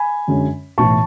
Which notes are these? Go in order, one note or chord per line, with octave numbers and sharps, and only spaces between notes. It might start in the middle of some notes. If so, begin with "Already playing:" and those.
Already playing: G#5 B5
F#2 D3 G#3 C#4
B1 A2 E3 A5 C#6